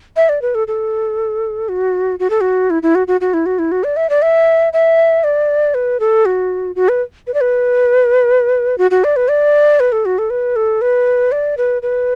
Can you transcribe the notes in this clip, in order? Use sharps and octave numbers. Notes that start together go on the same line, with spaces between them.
E5
D5
B4
A4
A4
F#4
F#4
A4
F#4
E4
E4
F#4
F#4
F#4
E4
F#4
E4
F#4
D5
E5
D5
E5
E5
D5
B4
A4
F#4
F#4
B4
B4
D5
B4
F#4
F#4
D5
B4
D5
B4
A4
F#4
A4
B4
A4
B4
D5
B4
B4